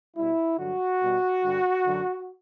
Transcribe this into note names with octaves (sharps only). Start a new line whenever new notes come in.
B2 G3 E4
G2 D3 F#3 F#4
B2 G3
G2 D3 G3
F#2 D3 F#3